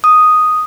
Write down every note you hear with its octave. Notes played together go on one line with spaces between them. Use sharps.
D#6